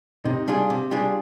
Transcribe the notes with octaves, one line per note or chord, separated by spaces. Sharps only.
C3 D#4
G3 D4 F4 G#4
C3
G3 D4 F4 G#4